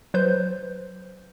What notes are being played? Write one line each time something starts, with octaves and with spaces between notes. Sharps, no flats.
F#3 B4 C5 G6